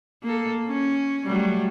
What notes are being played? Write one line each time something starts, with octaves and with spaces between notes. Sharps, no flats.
A#3 A4
C#4
F#3 G3 A3